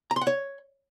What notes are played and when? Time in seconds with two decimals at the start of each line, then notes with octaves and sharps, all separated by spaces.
0.11 A#5
0.16 C6
0.21 F#5
0.27 C#5